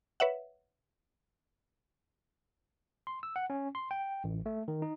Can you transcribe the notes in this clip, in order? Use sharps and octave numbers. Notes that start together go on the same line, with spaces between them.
B4 C#5 E5 F#5
C6
E6
F#5
C#4
C6
G5
A1
A3
D#3
D#4